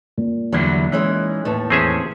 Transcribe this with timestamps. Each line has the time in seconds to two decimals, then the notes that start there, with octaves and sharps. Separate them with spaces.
0.17 A#2
0.52 E2 D3 F#3 G3 E4
0.92 E3 G#3 C#4 D#4
1.45 D#2 A2 A3 B4
1.70 E2 C4 C#4 G#4 E5